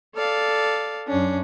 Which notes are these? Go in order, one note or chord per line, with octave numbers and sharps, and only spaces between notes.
A4 D5 F5
F#2 C#4 D4